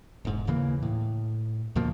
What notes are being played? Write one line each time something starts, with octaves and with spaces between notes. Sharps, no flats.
E1 G#2
D#2 C#3 E3 A#3
A2
D2 B2 F3 A#3